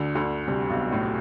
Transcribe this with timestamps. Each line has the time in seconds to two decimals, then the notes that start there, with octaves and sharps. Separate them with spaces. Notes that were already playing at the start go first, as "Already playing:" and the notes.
Already playing: D2 D3
0.15 D2 D3
0.47 C2 C3
0.69 B1 B2
0.92 A2